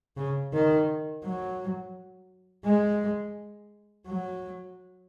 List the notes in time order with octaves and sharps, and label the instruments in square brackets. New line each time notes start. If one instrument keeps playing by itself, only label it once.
[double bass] C#3
D#3
F#3
G#3
F#3